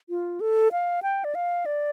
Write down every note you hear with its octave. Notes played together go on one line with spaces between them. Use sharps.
F4
A4
F5
G5
D5
F5
D5